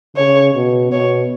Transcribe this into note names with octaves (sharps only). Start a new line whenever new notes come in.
C#3 C#5
B2
B2 C#5